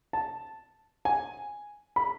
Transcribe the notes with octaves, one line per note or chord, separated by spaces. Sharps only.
A5
G#5
B5